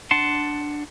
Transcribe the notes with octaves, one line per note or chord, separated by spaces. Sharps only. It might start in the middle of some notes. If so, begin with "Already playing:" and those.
D4 F#5 A5 C6